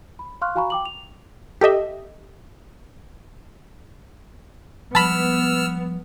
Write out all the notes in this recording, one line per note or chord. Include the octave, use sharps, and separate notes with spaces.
B5
F5 C6 C#6 F6 F#6
F#4 F5 G#5 A#5 B5 C#6
G5 D6 F#7
F7
G4 A4 D#5 E5
F3 G3 G#3 B3 A5 B5 E6 F6